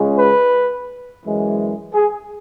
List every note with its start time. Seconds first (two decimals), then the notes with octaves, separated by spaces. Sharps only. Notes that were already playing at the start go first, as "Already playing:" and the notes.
Already playing: C#2 C#3 G#3
0.18 B4
1.24 F#2 E3 G#3
1.95 G#4